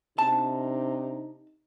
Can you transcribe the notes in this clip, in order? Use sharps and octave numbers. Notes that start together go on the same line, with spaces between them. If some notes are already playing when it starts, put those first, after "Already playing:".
C3 D4 D#4 A5